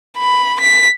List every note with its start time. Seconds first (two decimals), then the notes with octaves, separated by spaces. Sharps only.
0.18 B5
0.60 B6